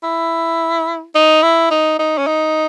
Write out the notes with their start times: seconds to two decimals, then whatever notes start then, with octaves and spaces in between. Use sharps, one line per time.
0.04 E4
1.15 D#4
1.43 E4
1.71 D#4
1.99 D#4
2.18 C#4
2.27 D#4